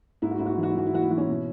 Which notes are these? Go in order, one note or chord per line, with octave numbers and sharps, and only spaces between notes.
G#2 E4
F#4
G#2 E4
F#4
E4
E3 F#4
E4
E3 F#4
E4
E3 F#4
E4
E3 F#4
C#4 E4
B2